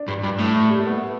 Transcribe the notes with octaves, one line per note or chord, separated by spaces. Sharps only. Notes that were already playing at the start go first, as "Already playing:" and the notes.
Already playing: D4
G2
G2
A2
G3
A3
B3